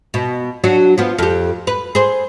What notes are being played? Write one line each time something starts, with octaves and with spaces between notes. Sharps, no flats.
B2
F#3 D4 F#4
F3 B3
F2 G4
B4
G#4 C5